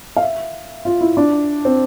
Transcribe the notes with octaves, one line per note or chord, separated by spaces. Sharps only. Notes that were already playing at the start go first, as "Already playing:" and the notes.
F5
E5
F4
E4
D4
C4